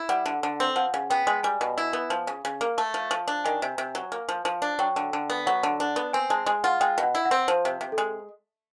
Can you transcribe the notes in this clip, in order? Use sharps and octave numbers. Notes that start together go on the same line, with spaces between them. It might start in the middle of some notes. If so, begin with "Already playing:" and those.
Already playing: E4
G3 F#5
D3
D3
C4
F3 F#5
C#3
B3 G5
G#3
G3 G#5
B2
E4
B3
F3
C#3
C#3
A#3
A3 A5
F3
F3
D4
D#3 G#5
C3
C3
F#3
A#3
F3
F3
D4
F#3 G5
D3
D3
B3
F#3 F#5
D3
D4
B3
C4 G#5
G#3 A5
G#3 G#5
F4 F#5
G#3 G5
B2
F#5
E4
F#5
C4
F3 C5
C3
C3
A4
G#3